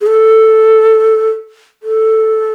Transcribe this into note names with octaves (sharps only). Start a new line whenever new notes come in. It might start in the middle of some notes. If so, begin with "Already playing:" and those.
G#4
A4
A4